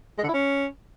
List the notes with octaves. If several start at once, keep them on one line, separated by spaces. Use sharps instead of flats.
G#3
D3
E4
C#4